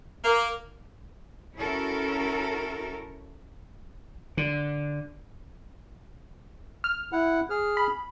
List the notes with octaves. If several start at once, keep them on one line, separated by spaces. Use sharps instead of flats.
A#3
C#4 E4 F#4 A4 A#4
D3
F6
E4 F#5
G#4 F6
B5